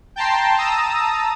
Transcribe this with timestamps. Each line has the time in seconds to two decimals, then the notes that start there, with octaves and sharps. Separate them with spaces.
0.16 G5 A5 A#5 C6
0.57 A5 A#5 D#6 E6